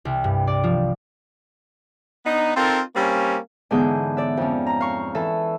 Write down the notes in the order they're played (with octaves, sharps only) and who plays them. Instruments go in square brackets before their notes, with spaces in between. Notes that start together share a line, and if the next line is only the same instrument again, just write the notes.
[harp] C2
G2
D5
F3
[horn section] B3 D4 D#4
C4 D#4 F4 A4 A#4
G3 A#3 C4 C#4
[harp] G#2 D3 E3 B3 G#4 G6
D5 E5
F2 C#4
A#5
F5 C#6
E3 A4 E5